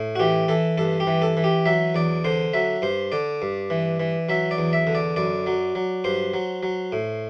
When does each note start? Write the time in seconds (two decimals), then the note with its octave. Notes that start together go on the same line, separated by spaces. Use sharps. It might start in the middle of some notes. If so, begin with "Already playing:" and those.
Already playing: A2
0.16 F#4
0.20 E3 G4
0.48 E3 A4
0.78 G2 A4
1.00 G4
1.07 E3
1.22 A4
1.37 E3
1.44 G4
1.66 F#3 E5
1.95 E2 D5
2.24 D3 C5
2.53 F#3 E5
2.82 G2 C5
3.12 D3 D5
3.42 G2
3.70 E3
4.00 E3
4.29 F#3 E5
4.51 D5
4.59 E2
4.73 E5
4.87 D3
4.95 D5
5.16 F#2 D5
5.47 F#3
5.75 F#3
6.04 G2 C5
6.34 F#3
6.63 F#3
6.92 A2